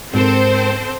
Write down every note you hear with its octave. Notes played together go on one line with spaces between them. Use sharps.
G#2 C4 A4 A#4 C5